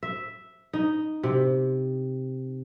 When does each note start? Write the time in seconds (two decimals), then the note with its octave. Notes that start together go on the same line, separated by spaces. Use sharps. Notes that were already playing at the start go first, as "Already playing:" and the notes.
0.03 E5
0.73 D#4
1.23 C3